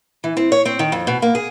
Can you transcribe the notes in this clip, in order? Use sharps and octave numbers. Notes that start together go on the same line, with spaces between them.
E3
C4
C#5
C4
D#3
F2
B2
A#3
G#4